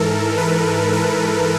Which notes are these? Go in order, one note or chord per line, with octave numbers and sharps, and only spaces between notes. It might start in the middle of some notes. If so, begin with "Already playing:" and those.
Already playing: G#2 E3 A4 A#4
B4
B4